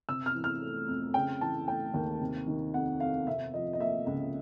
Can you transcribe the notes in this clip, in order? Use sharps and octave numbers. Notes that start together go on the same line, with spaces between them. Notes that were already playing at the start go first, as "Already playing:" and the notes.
C3 E6
F6
E3
F6
A3
F2
C#3 G5
E3 A5
A3 G5
D#2
C3
D#3
F2 F#5
F2 F5
C3 E5
F3 D#5
D#5
A#3 E5
C#2